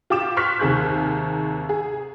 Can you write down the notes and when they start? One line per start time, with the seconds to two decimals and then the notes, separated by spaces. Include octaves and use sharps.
0.10 F4 G4 D6 E7
0.37 C6 C#6 F6 F#6 B6
0.59 D#2 C3 G#4 F#6 G6
1.69 G#4